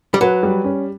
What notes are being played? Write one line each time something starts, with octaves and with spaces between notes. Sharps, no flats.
G3
F#3 B4
G3
C#4